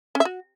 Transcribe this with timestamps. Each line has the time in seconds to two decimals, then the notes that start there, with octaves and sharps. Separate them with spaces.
0.15 C#4
0.20 E5
0.25 F#4